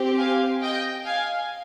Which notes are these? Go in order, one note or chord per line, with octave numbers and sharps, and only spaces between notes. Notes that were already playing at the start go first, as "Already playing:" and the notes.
Already playing: C4 G4
F5 G#5
D#5 G5
F5 G#5